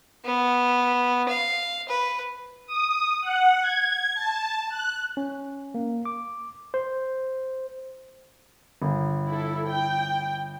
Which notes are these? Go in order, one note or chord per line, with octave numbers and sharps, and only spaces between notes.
B3
F5
B4
D#6
F#5
G#6
A5
F#6
C#4
A#3
D6
C5
G1
E4 A4
G5